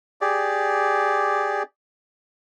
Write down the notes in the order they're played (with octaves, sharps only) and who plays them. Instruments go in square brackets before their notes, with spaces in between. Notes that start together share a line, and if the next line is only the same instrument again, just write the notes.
[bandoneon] G4 G#4 D5